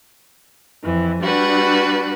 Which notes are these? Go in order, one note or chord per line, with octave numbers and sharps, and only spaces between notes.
F2 E3
G3 D4 F#4 B4